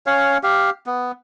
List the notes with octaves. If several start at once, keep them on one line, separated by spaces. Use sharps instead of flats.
C#4 C#5 F5
G4 F5
B3